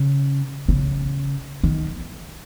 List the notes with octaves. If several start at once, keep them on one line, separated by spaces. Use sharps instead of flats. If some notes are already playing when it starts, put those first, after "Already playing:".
Already playing: C#3
C#3
D#3